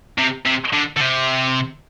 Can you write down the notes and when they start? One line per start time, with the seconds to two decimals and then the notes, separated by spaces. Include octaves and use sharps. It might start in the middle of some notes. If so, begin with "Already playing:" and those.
0.18 C3
0.46 C3
0.73 D3
0.97 D3
1.01 C3